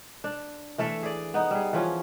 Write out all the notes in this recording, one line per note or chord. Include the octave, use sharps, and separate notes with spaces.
D4
E3 A3 A4 E5
G#4 D5
B3 D#4
G3 G#4
E3 F3 C#4